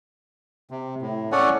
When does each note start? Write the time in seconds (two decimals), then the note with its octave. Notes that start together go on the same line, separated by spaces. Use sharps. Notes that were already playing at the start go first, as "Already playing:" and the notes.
0.71 C3
1.02 A2
1.32 C#4 A4 C#5 D5 F#5 G#5